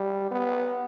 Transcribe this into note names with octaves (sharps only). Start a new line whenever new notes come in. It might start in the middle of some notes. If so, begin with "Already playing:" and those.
Already playing: G3
B3